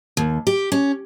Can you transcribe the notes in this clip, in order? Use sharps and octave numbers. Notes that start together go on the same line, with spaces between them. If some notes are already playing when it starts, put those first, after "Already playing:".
D#2
G4
C#4